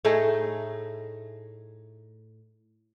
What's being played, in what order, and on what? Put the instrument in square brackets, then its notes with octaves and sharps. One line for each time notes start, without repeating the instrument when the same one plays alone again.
[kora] A2 A3 D#4 G#4